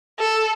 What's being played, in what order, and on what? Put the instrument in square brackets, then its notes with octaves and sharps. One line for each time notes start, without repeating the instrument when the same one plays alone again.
[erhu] A4